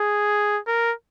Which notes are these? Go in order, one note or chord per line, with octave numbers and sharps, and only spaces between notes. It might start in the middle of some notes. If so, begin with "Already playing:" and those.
Already playing: G#4
A#4